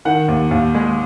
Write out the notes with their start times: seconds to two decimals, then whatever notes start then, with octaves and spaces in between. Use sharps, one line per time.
0.05 D#3 F#5
0.28 D#2
0.51 D#2
0.74 G#3